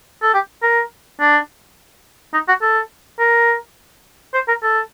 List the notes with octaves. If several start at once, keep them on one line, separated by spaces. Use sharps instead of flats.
A4
G4
A#4
D4
D#4
F#4
A4
A#4
C5
A#4
A4